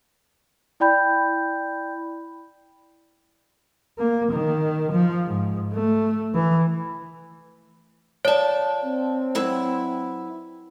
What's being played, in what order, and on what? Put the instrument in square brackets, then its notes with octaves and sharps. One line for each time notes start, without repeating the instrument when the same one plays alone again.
[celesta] E4 D5 G5 B5 G6
[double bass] A#3
D#3
F3
G#2
A3
E3
[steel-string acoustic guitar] F3 A5 [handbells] C#5 D5
[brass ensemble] C4
[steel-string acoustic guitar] F#3 E4 B4